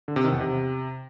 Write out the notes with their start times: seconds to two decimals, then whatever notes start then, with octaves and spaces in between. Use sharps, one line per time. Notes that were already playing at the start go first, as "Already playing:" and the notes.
0.08 D3
0.16 C3
0.24 D#3
0.32 E2
0.40 C3